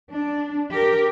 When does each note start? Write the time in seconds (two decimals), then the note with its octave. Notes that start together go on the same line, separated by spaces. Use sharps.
0.11 D4
0.72 G4 A#4